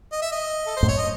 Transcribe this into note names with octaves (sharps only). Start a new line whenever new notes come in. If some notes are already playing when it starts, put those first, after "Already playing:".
D#5
E5
D#5
A4
C5
F#2 A2
C#5
D#5